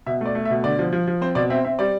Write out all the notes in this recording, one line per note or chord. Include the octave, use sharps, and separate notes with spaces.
B2 E5
A3 D5
A3
E5
B2
D3 D5
F3
F3
F3
C4 C5
B2 D5
C4 E5
C4 E5
G3 D5